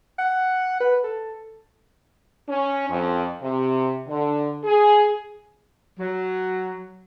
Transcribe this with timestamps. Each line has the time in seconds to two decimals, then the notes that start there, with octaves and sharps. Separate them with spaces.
0.19 F#5
0.80 B4
1.04 A4
2.49 C#4
2.89 F2
3.41 C3
4.08 D3
4.64 G#4
5.99 F#3